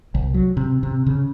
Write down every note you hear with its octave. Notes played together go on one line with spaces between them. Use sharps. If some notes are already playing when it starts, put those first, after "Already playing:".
C2
F#3
C3
C3
C#3